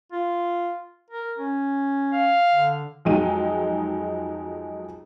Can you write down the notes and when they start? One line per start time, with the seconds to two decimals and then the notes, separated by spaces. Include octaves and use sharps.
0.12 F4
1.10 A#4
1.39 C#4
2.14 F5
2.52 D3
3.05 F2 F#3 G#3 D#4 D#7